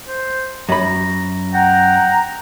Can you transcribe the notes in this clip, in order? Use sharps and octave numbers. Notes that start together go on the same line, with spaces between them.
C5
F#2 A#5 B5
F#5 G5 A#5